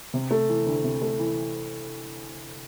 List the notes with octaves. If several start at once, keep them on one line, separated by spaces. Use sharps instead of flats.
C3
A3
E3
D2
C3
A3
E3